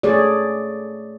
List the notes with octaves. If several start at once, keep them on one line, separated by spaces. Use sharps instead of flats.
A3 G#4 C#5 D5